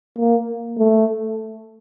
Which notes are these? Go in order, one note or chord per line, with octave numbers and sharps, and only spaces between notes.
A#3
A3